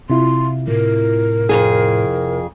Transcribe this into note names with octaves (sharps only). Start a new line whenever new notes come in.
C3 E4 F4 C6
A2 A#4
F2 G#2 G#4